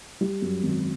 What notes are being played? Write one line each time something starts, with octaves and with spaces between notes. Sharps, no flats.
G3
F#2
G#1